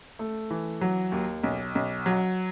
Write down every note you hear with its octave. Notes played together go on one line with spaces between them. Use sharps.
A3
E3
F#3
D#2
B1
B1
F#3